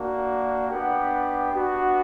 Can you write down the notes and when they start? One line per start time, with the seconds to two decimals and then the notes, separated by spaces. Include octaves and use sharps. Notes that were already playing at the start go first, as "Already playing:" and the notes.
Already playing: A#3 D4 F#4
0.70 B3 D4 G4 F#5
1.52 B3 D4 F#4